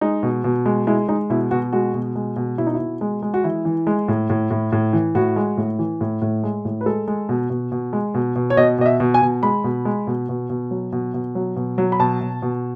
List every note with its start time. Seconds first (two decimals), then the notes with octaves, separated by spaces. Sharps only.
0.01 G#3 D#4
0.23 B2
0.44 B2
0.66 G#3
0.87 G#3 E4
1.08 G#3 D#4
1.30 B2 E4
1.51 B2 F#4
1.73 G#3 F#4
1.94 B2
2.15 G#3
2.36 B2
2.58 B2 E4
2.67 D#4
2.74 E4
2.80 B2
3.01 G#3
3.22 G#3
3.34 F#4
3.44 E3 E4
3.65 E3
3.87 G#3
4.08 A2
4.30 A2
4.51 A2
4.72 A2
4.93 E3
5.15 A2 F#4
5.36 G#3
5.57 A2
5.79 E3
6.01 A2
6.22 A2
6.43 G#3
6.65 A2
6.81 B4
6.86 G#3 A4
7.08 G#3
7.29 B2
7.50 B2
7.72 B2
7.93 G#3
8.14 B2
8.36 B2
8.50 C#5
8.57 B2 D#5
8.78 B2 D#5
8.86 E5
9.00 B2
9.14 G#5
9.22 B2
9.43 G#3 B5
9.64 B2
9.85 G#3
10.07 B2
10.29 B2
10.50 B2
10.71 F#3
10.92 B2
11.14 B2
11.35 F#3
11.56 B2
11.78 F#3
11.92 B5
12.00 B2 A5
12.21 B2
12.42 B2